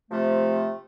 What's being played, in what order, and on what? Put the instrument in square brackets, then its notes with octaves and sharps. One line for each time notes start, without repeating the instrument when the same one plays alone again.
[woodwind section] C3 F3 A3